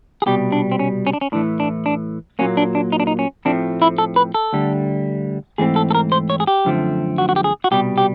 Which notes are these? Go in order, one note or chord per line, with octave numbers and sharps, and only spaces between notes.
G#4
C2 B2 G3 G4
D4
C4
C#4
C#4
D4
C#4
A2 E3 A3 D4
D4
D4
A#2 F#3 A#3 C#4
D4
D4
D#4
D4
D#4
C#4
A2 F3 A3 C4 D4
E4
A4
B4
A4
D2 D3 G3
G#2 E3 A3 C4 G#4
A4
A4
A#4
C5
C#5
G#4
G4
F#2 D3 F3 A3 C4
F#4
F#4
G4
G#4
F#4
C2 B2 G3 G4
G4